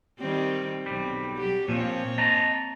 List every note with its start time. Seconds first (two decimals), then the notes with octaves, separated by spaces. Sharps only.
0.19 D#3 G3 C4
0.86 B1 G3 C4
1.34 F#3 G4
1.68 A#2 F3 A#3 C4 C#5
2.18 D#5 A5 A#5